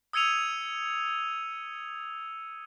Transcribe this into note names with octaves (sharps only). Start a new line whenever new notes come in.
D#6 E6 G#6 C#7 D#7 F7